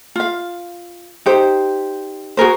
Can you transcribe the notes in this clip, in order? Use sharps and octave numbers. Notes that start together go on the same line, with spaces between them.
F4 F5
D#4 G4 C5
F#4 G#4 A#4 C5